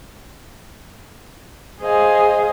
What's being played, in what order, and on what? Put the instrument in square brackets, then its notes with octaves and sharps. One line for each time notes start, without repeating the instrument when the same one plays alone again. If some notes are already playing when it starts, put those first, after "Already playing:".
[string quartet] G#4 C5 D#5 F5 G#5